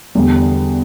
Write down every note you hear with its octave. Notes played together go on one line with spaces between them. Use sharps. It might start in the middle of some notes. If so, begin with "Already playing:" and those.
E2 D3 G3